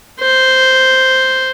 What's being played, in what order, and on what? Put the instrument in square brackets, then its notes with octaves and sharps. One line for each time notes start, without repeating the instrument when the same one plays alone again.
[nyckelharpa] C5